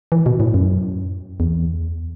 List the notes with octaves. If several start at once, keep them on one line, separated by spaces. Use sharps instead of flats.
E3
B2
A2
F#2
E2